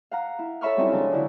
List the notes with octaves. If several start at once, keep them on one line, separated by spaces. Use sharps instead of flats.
F5 F#5 A#5
E4
A4 C#5 E5 B5 C#6 F6
F#3 G3 C4 C#4 D#4 E4
C#3 F3 G#3 D4 D#4 A4
D3 F#3 E4